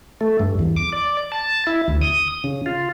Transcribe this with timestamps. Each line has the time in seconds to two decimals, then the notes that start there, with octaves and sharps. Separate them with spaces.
0.21 A3
0.40 G2
0.59 E2
0.77 D6
0.93 D5
1.32 A5
1.67 E4
1.88 D2
2.01 D#6
2.44 C#3
2.66 F4